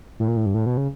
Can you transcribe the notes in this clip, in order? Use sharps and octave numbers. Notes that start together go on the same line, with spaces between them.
A2
A#2
A2
G2
A2
B2
C#3